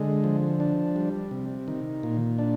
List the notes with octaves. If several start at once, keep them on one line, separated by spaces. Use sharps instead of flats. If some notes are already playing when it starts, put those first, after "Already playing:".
Already playing: D3 G#3
F3
D4
G3
C3
D#3
A#2
D4